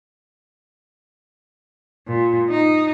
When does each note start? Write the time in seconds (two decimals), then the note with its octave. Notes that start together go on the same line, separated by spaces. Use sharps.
2.08 A#2
2.50 D#4